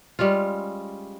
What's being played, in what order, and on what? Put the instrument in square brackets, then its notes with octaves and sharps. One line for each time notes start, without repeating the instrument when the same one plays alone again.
[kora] G3 G#3 C#4 F4